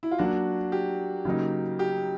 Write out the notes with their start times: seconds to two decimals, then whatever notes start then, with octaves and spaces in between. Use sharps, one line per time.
0.03 E4
0.11 F4
0.18 F#3 A#3 D4 F#4
0.72 G4
1.25 C#3 F#3 A#3 D#4
1.79 G4